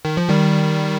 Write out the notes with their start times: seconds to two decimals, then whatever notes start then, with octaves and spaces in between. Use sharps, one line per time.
0.05 D#3
0.17 F3
0.29 D#3 G3